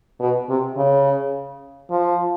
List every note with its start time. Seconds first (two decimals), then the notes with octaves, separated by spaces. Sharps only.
0.20 B2
0.49 C3
0.77 C#3
1.90 F3